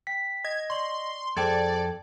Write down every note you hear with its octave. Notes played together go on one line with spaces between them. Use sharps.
G5 B6
D#5 G#6
D5 C6 C#6 F#7
F2 G#4 A4 C5 D5 G5 A5 G#6